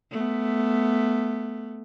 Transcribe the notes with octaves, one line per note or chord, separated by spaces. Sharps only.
A3 B3